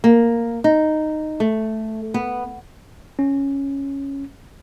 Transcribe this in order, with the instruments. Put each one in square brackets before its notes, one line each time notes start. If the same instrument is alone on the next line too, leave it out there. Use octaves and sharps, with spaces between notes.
[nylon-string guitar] A#3
D#4
A3
B3
[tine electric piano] C#4